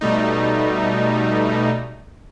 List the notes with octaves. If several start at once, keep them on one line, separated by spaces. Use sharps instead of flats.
B2 G3 A3 D#4